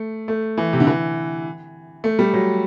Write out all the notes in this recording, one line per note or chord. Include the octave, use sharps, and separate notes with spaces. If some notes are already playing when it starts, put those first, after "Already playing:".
Already playing: A3
A3
E3
C3
D3
E3
A3
G3
F#3